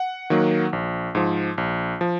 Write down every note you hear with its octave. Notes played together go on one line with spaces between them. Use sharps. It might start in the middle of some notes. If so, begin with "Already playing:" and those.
Already playing: F#5
D#3 F#3 A#3
A#1
G#2 F3
A#1
F3